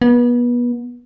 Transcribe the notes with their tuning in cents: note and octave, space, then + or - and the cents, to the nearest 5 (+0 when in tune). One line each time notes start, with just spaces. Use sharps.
B3 -30